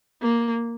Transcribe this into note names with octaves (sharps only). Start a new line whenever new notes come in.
A#3